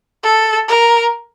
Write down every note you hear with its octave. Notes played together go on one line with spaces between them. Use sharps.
A4
A#4